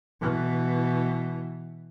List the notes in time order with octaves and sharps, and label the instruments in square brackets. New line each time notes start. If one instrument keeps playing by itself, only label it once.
[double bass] B2 E3